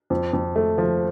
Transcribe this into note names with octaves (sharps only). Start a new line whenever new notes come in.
F2
F2
A3
F3